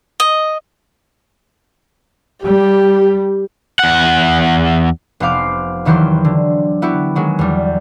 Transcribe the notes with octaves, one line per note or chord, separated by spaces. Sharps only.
D#5
G3 G4
E2 F#5
F1 B3 C5 F5 D6
E2 D#3 E3 F#3 G4 C6
D3
B3 E4 F#4 G4
D#3 F#3 G#3
E2 G3